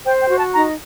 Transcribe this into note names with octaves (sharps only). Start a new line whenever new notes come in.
C5 G5
G5
F#4
A5
D#4 A#5